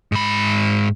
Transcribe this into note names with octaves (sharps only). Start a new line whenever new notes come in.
G#2 B5